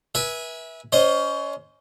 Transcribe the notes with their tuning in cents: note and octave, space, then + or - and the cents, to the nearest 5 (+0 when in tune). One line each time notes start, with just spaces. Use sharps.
B4 -35 E5 -15 G#5 +0
C#4 +25 C5 +0 D#5 +0